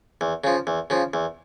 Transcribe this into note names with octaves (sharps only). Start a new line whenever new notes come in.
E2
C#3 F3
E2
C#3 F3
E2